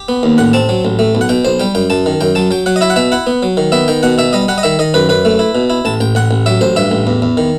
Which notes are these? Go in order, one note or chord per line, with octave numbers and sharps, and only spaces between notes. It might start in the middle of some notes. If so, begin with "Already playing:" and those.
Already playing: G4
B3
D#2
A1 F#5
C4 A5
F#3
A1
A3
B1
F#5
B2 G5
B1 C5
G3 G5
F#2 G5
F#2 A5
D#3
F#2 G5
F#3 A5
F#3 G5
F#3 F#5
D#5
E4 E5
F#5
B2 E5
E4 F#5
B3
F#3
D#3
B3 E5
D#3 G5
B2 F#5
B2 E5
G3 D#5
G3 F#5
D#5
D#3 E5
D#3 D#5
F#2 B4
F#2 B4
A3
E4
B2
E4
A1 A5
A1 G5
A1 F#5
A1
F#3 E5
A1 C5
G2 E5
A1
E2
E2
D#3